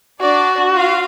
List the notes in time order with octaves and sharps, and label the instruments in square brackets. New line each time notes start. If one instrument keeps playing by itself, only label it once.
[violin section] D4 D5 [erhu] F#4
[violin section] F4 F5